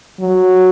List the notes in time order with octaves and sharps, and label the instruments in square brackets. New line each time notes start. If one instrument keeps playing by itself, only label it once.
[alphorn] F#3